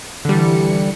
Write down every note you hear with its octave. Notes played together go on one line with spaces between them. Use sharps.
D3 E3 G3 C#7